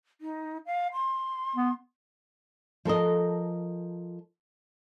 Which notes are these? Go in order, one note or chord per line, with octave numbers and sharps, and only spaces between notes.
D#4
F5
C6
B3
F3 A4 A#4 D#5